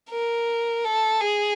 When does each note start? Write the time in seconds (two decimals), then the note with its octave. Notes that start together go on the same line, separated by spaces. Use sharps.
0.11 A#4
0.85 A4
1.21 G#4